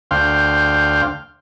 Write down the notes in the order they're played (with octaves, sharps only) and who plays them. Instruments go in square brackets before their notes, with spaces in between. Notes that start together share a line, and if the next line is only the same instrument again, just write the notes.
[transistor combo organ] D2 C5 F5 G5